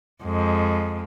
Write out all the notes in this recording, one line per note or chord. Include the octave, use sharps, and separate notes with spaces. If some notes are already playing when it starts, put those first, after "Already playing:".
F2 G#3